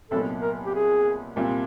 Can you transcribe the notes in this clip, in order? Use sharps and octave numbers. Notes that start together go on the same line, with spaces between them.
C2 A#2 F#3 B3 D#4 A4
A#4
G4
G#4
C2 A#2 G3 C4 F4